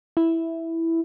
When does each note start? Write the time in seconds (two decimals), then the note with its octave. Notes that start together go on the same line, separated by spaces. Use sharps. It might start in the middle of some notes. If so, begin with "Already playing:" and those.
0.17 E4